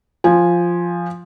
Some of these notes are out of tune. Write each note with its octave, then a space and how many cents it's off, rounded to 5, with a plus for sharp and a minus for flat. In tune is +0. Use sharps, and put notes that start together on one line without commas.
F3 +0 G#5 +0